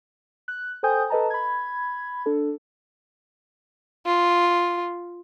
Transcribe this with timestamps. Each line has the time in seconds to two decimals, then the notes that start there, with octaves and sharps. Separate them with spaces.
0.48 F#6
0.83 A4 C5 G5 G#5 D#6 G6
1.10 A4 B4 D#5 A5 A#5
1.30 B5 G#6
2.26 D4 A4
4.06 F4